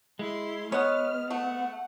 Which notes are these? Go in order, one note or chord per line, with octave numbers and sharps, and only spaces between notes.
G#3 E4 C6
G#3 B3 C#5 F#5 F6
A3 F#5